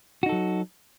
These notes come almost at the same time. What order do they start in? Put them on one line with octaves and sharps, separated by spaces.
F#4 D#4 A4 F#3